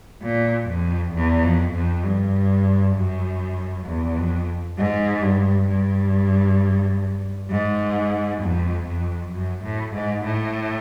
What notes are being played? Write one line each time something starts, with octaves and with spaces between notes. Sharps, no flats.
A#2
F2
E2
F2
F2
G2
F#2
E2
F2
G#2
G2
G2
G#2
F2
F2
F#2
A2
G#2
A2